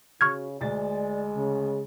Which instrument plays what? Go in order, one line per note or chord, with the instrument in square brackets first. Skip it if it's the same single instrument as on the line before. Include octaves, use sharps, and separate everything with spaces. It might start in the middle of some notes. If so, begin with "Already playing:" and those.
[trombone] C#3 [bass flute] F#4 [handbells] C#6 F6 G#6
[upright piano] D2 A6 [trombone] G#3 [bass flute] D5
[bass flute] C#3